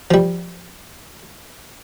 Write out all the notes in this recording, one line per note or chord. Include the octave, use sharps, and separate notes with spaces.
F3 G3